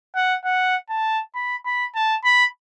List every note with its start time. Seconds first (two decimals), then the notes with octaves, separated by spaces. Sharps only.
0.15 F#5
0.45 F#5
0.90 A5
1.35 B5
1.65 B5
1.95 A5
2.24 B5